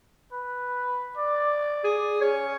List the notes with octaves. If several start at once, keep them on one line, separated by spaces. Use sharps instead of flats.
B4
D5
G#4
C#4 C#5